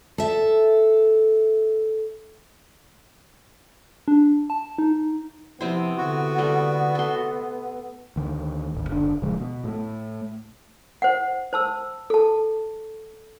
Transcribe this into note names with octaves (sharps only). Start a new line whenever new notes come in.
A4 E5
D4
A5
D#4
C3 F3 B3 E4 C5
D3 F#4
G3 A3
A4 C6
D2 D#3
D1 G#1
F#1 D3 D4
D#1 C#3 F3 G#3
B2
A2 A3
C5 F#5
C5 A5 E6
A4 A5